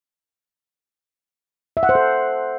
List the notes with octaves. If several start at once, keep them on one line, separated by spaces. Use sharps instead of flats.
E5
F#5
C5
A4